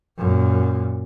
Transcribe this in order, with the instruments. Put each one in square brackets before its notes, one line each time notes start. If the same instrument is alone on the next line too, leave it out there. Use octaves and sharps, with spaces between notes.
[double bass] F#2 A#2